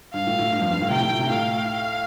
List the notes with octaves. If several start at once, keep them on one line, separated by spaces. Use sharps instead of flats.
G2 F5
A2
A2
G2
F2
G2
A2
C3 G5
A2
A2
C3
A2 F5